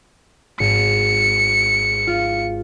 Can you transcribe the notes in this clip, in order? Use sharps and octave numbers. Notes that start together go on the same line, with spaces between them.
G#1 C#7
F4